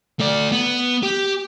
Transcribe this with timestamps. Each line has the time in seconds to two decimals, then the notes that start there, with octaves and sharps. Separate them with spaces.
0.20 A3 D5
0.52 B3
1.03 G4